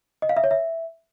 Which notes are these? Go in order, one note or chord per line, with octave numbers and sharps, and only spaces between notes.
D#5
F5
E5
C#5
E5